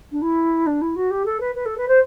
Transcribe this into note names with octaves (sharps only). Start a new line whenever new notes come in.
D4
E4
D4
E4
F#4
G4
A4
B4
B4
A4
B4
C5